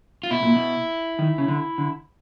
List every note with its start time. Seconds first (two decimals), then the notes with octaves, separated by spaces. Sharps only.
0.23 F4
0.31 B2 E4
0.43 A#2
0.55 B2
1.19 D#3
1.38 C#3
1.48 D3
1.78 D3